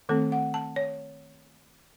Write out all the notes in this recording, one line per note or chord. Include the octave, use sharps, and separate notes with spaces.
D#3 A3 C4 A4
F#5
A5
C#5